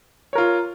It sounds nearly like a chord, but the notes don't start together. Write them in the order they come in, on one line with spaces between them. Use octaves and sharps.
C#5 A#4 F4